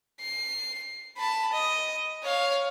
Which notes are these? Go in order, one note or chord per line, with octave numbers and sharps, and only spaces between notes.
C7
A5 B5
D#5
C#5 F5